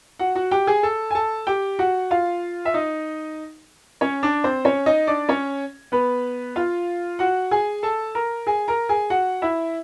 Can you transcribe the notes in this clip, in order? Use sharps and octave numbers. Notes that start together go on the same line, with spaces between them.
F#4 F#5
F#4 F#5
G4 G5
G#4 G#5
A4 A5
G#5
A4 A5
G4 G5
F#4 F#5
F4 F5
E5
D#4 D#5
C#4 C#5
D4 D5
C4 C5
C#4 C#5
D#4 D#5
D4 D5
C#4 C#5
B3 B4
F4 F5
F#4 F#5
G#4 G#5
A4 A5
A#4 A#5
G#4 G#5
A#4 A#5
G#4 G#5
F#4 F#5
E4 E5